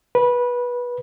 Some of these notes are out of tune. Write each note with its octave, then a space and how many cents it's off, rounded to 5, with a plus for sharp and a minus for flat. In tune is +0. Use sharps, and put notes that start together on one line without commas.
B4 -20